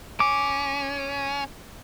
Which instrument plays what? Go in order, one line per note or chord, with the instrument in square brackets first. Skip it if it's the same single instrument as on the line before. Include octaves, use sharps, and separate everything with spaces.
[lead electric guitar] C#4 [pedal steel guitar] D6